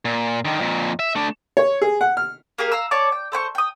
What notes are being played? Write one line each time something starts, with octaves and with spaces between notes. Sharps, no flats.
A#2
D3 D#3
F2 A#2
E5
A3 D4
C#5
G#4
F#5
F6
A#3 G4 G#4 A#4
F5 A#5 E6
C#5 D5 A5 D6
G5
A3 C5 G5 C#6
G5 D#6